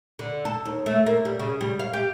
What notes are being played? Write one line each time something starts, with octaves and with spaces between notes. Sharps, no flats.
D3
A4
D#2
A3
A#3
G3
C#3
G3
F5
G4